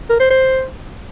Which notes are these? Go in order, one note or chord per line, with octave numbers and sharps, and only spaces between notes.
A#4
C5
C5